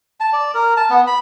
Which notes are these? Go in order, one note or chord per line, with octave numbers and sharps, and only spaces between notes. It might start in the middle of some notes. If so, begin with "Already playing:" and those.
A5
D5
A#4
A5
B3
B5